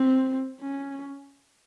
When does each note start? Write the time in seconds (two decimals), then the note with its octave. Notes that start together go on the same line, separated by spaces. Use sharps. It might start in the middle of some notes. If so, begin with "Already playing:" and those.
Already playing: C4
0.61 C#4